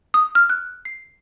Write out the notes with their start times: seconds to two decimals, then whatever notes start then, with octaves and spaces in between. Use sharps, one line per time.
0.14 D#6
0.35 F6
0.50 F#6
0.85 C7